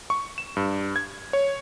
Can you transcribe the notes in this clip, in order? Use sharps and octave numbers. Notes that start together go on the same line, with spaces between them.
C#6
E7
G2
G#6
C#5